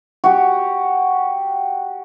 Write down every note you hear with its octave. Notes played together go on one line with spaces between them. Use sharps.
F#4 G4